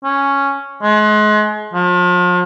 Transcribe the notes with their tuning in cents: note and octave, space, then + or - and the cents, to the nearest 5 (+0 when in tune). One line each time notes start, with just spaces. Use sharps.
C#4 +0
G#3 +35
F3 +40